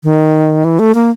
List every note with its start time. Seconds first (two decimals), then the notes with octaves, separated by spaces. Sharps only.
0.03 D#3
0.64 E3
0.79 A3
0.95 A#3